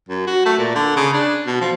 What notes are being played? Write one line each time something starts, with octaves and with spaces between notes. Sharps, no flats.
F#2
F#4
A3
A#2
D3
C#3
D4
B2
F3